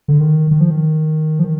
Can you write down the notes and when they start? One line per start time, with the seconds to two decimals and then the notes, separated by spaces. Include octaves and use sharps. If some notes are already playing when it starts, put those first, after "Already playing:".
0.08 D3
0.20 D#3
0.51 D#3
0.60 F3
0.70 D#3
1.39 F3
1.45 D#3